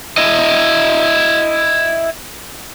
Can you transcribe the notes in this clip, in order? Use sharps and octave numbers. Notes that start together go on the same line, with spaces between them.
E4 D#5